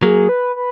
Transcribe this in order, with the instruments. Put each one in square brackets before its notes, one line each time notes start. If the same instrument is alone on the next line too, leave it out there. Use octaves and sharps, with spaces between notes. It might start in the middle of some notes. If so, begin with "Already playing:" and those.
[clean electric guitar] F#3 A#3 [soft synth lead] G#4
[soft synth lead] B4
B4